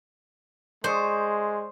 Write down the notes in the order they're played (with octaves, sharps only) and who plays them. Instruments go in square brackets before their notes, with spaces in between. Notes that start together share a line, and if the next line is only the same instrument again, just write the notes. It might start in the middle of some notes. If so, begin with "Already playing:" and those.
[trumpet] G#3 [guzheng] C5 [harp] D5 C#6 D#6